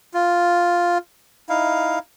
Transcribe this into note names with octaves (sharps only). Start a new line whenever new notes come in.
F4
D#4 E4 F5